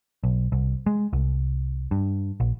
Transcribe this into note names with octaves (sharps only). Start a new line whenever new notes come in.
B1
C2
G#3
C2
G2
A#1